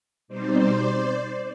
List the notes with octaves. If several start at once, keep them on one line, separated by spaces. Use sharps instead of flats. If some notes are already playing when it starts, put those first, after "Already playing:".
B2 G3 C4 D#4 C5 D5